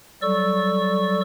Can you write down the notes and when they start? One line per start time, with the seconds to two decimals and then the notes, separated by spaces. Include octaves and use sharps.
0.22 F#3 G3 A4 D5 C#6 E6